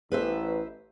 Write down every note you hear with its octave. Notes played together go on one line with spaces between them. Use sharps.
A1 B4 C5 E5